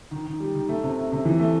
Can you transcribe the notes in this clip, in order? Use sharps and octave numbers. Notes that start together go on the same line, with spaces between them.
D#3
D#3
G3
D#3
A3
C3
A3
C3
E3
A3